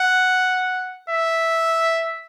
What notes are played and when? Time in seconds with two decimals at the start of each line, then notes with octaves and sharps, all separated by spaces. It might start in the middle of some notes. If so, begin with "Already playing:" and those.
Already playing: F#5
1.10 E5